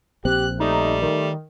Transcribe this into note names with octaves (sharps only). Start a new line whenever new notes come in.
A#1 C4 G4 F#6
G3 A3 D#4
D#3 A3